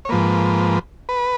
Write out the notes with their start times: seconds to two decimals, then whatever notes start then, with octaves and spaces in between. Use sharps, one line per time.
0.05 C#5
0.09 G#2 F3 A#3 B4
1.09 B4